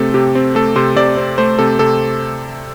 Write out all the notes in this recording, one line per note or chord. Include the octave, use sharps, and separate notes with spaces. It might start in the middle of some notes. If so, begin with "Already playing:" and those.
Already playing: C3 A3 C4 A4
C3 G4
C4
A3 A4
C3 C5
C3 D5
C4
A3 C5
C3 A4
C3 A4